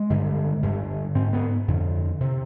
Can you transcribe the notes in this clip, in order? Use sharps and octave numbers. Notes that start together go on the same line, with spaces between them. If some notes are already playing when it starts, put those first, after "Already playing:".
Already playing: G#3
G2 D3
G2 D3
G#2 C4
B3
F2 D3
C3